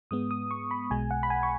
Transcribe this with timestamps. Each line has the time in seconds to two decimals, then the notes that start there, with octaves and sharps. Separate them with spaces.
0.11 G#2 G#3 B3 D#6
0.31 D#6
0.51 C#6
0.71 B5
0.91 B1 B2 G#3 G#5
1.11 F#5
1.23 B5
1.30 G#5
1.43 C#6